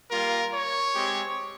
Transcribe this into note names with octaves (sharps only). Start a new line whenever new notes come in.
G3 A#3 F4 A#4
C#5
G#3 C4 G4